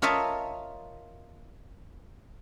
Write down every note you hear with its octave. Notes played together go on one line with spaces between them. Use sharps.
F4 A#4 C#5 D#5 E5 A5